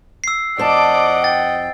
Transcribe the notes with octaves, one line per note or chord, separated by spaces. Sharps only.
E6 C7
F2 C5 D5 D#5 F#5 A5 D6
G5 A6